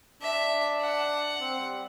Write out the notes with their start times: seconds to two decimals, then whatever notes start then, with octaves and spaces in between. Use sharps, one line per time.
0.22 D4 E5
0.81 F#5
1.40 C4
1.60 G3